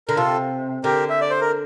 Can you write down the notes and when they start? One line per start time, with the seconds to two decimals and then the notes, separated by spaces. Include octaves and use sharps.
0.08 D3 A#4
0.16 C3 F4 A4
0.84 D3 G4 A#4
1.10 E5
1.21 D5
1.30 C5
1.41 A#4